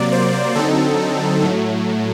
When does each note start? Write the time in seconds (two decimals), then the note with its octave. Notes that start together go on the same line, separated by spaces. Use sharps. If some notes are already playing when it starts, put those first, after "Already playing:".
Already playing: C3 F#3 A#3 D5
0.12 C5
0.55 D3 F#3 C4 D#4 A4
1.42 A2 F#3 A3